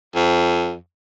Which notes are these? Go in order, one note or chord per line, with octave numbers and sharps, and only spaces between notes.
F2